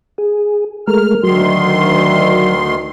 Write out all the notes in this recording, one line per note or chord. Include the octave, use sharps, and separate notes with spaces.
G#4
G#3 A3 A#4 F6
D2 D#3 F#3 C6